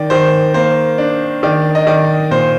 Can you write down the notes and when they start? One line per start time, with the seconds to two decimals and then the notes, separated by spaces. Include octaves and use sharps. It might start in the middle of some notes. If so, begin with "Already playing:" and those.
Already playing: D#3 D#4 D5
0.10 D#3 C5
0.54 A#3 C5
0.98 D4
1.43 D#3 D5
1.75 D#5
1.87 D#3 D5
2.31 A#2 C5